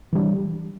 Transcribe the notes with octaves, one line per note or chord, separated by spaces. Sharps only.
E3 G3 D4